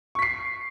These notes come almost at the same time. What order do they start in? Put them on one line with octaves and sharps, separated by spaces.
C#6 B6 C7